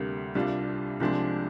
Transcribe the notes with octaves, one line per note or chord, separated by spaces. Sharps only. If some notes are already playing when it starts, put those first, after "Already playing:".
Already playing: D2 C3 G3 A#3
C2 C3 G3 D4 F4
C2 C3 F3 G#3 D4